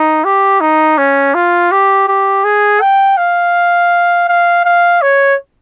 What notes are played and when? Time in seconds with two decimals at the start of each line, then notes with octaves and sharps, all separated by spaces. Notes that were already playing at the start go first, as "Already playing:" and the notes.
Already playing: D#4
0.25 G4
0.61 D#4
0.98 C#4
1.34 F4
1.72 G4
2.08 G4
2.45 G#4
2.81 G5
3.18 F5
4.28 F5
4.65 F5
5.02 C#5